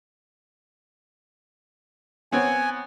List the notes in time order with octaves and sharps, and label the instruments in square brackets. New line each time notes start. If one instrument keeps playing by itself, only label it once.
[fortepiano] B3 C4 C#5 [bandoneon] G#5